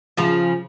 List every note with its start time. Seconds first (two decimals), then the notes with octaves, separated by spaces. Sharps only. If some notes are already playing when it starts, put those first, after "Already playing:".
0.17 C#3 F3